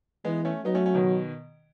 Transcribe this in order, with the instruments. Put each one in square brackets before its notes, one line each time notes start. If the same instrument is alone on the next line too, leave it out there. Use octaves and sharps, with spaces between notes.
[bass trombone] E3 [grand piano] G#3 B3
[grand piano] A3 C#4
[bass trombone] F#3 [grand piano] B3 D#4
[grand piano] A3 C#4
A3 C#4
B2 D#3